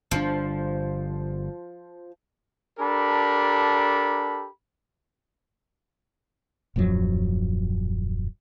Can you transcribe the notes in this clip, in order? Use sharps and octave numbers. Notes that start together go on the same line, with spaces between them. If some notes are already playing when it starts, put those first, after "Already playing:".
G1 D3 F3 D4
D4 G4 A4 A#4 A#5 B5
D#1 F#2 F3 F#3